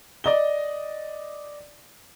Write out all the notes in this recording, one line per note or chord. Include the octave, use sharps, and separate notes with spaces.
D5 D#5 G7